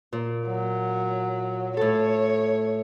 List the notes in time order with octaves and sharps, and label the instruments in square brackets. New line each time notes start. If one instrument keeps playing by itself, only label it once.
[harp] A#2
[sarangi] F#3
[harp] A2 A4 [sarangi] C#5